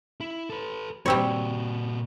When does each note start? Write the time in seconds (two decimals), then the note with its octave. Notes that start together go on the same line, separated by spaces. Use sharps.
0.20 E4
0.49 A4 B4
1.06 A#2 G3 C4 F#4 C#5